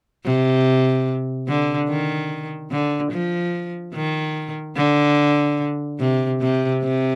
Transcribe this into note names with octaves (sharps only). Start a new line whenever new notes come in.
C3
D3
D#3
D3
F3
D#3
D3
C3
C3
C3